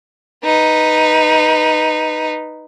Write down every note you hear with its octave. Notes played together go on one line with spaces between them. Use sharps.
D#4 B4